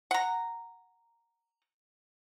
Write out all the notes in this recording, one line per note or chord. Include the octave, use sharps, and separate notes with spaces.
F#5 A#5